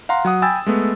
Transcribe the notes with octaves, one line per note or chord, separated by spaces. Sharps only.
F5 F#5 A#5 C6
F#3 F#5 D#6
G5 G#5 B5 E6 A6
G#3 A3 B3